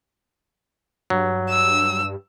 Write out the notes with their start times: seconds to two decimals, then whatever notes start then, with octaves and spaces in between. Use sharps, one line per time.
1.10 G2 F#3
1.50 E6